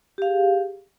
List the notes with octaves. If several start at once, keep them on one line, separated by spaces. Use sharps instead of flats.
G4 G#4 F5